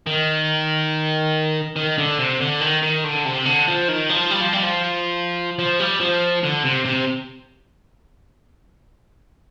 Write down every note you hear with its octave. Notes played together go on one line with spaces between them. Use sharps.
D#3
D#3
D3
C3
D3
D#3
D#3
D3
C3
D3
F3
D#3
F3
G3
F3
G3
F3
F3
G3
F3
D3
C3
C3